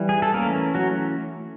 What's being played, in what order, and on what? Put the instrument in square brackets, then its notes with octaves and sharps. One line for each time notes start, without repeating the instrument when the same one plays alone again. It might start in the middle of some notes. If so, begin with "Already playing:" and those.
Already playing: [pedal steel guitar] E3 G3
G#4
A4
E3 A3 A#3 C#4 A#4
F#3 F#4